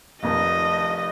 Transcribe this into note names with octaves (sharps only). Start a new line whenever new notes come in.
F1 F2 D#3 D#5